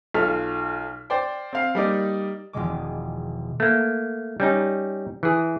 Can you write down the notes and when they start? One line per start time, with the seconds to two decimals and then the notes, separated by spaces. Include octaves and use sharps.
0.14 B1 F4 A4 F6
1.10 C5 D5 G5
1.53 C4 F5
1.75 G3 A#3 D#4 D5
2.53 E1 B2 D#3 F3 G#3 D6
3.60 A3 A#3
4.40 G3 C#4 D#4
5.23 E3 G#4